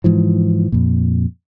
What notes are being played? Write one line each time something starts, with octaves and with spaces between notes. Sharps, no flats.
G#2 E3 F3
F2 A#2